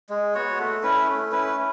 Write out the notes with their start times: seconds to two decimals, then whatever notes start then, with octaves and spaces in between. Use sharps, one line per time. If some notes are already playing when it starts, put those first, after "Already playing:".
0.10 G#3
0.35 B3 F#4 C#5
0.59 A3
0.83 C#4 E4 B4
1.08 A3
1.32 C#4 E4 B4
1.56 E4